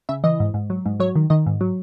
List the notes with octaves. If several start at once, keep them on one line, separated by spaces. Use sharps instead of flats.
C#3 E5
E3 D#5
G#2
G#2
F#3
G#2
F#3 C#5
D#3
D#3 D#5
G#2
F#3